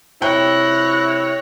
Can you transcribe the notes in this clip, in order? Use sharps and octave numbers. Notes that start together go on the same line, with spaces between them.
C3 E4 C#5 G5 F#6 A#6